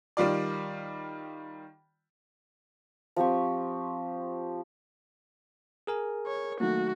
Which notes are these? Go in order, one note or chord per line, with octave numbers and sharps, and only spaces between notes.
D#3 G3 F4 D5
F3 C4 G4 C#6
G#4 A#4 G#5
C#5
D#3 F#3 A3 A#3 F#4